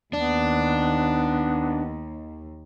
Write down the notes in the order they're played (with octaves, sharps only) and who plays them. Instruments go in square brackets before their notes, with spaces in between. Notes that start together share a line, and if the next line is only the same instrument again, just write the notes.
[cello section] D#2 [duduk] B3 [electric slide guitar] D4